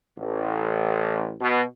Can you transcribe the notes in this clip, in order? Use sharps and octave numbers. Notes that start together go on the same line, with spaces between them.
A1
B2